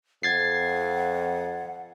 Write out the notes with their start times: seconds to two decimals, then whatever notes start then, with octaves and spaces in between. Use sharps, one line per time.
0.23 F2 F#5 G#6 A6 C7